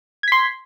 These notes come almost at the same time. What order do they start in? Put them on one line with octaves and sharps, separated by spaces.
G#6 B6 C6